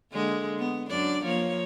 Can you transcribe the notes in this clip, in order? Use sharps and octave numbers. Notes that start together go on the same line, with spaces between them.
D3 G#3 A#3
B3
F#2 D4 D5
F3 A#3 C#5